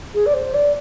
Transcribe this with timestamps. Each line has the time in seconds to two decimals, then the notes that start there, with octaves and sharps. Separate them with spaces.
0.14 G#4
0.26 D5
0.33 C5
0.54 D5